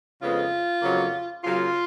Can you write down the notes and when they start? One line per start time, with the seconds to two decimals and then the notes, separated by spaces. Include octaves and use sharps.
0.20 F2 C#3 G#3 B3 F4
0.82 F2 C#3 F#3 A#3
1.43 C#3 F#3 A#3 F4